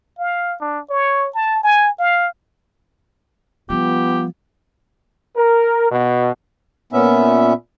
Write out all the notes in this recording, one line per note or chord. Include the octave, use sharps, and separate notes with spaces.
F5
D4
C#5
A5
G#5
F5
F3 G3 B3 F4 G4
A#4
B2
A#2 B3 C#4 E5